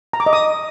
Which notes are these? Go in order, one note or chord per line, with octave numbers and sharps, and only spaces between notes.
A#5
D6
D#5
D#6